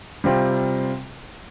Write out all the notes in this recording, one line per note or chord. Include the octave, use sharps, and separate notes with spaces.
C3 G3 C4 F4